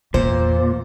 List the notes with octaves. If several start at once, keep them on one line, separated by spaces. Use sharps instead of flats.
E2 A#2 C5